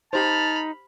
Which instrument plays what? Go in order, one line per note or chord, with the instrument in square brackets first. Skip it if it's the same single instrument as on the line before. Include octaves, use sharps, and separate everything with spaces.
[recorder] D#4 [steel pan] G4 C5 [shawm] A5 [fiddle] B5 F6